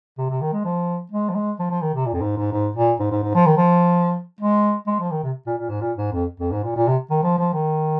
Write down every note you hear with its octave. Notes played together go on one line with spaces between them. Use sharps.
C3
C3
D#3
G#3
F3
G#3
F3
G#3
F3
F3
D#3
C3
A#2
F2
G#2
G#2
G#2
A#2
G#2
G#2
G#2
F3
D#3
F3
G#3
G#3
F3
D#3
C3
A#2
A#2
G#2
A#2
G#2
F2
F2
G#2
A#2
A#2
C3
D#3
F3
F3
D#3